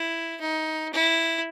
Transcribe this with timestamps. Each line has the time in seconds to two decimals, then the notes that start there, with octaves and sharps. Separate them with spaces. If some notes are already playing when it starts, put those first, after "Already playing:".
Already playing: E4
0.41 D#4
0.93 E4